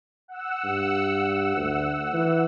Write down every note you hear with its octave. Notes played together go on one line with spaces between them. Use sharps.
F#5 E6
G2
D2
E3